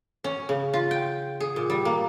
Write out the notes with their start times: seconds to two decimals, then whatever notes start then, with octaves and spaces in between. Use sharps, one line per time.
0.24 C#4
0.49 C#3
0.73 F4
0.91 G5
1.40 G#4
1.56 A#2
1.70 G3
1.85 A#3